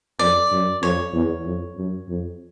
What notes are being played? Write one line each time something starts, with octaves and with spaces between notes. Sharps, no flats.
F2 D5
F#2
F2 C#5
E2
F2
F#2
F2